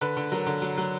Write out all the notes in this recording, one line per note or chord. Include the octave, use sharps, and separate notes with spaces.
D3 B4
D3
F#3 A#4
D3
F#3
F#3